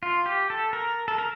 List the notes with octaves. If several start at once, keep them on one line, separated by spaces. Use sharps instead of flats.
F4
G4
A4
A#4
A4
A#4